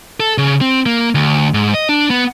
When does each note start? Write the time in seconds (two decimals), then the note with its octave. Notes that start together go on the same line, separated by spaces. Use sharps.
0.20 A4
0.38 C#3
0.61 C4
0.86 A#3
1.15 D2
1.54 G#2
1.74 D#5
1.89 D4
2.10 B3